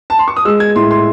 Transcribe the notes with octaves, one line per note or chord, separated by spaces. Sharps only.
A5
C6
C#6
D#6
G#3 E6
G#6
A2 C6
C6